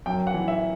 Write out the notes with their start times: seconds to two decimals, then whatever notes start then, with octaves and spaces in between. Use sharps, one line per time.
0.06 F#2 G5
0.27 F#5
0.34 E3
0.48 E5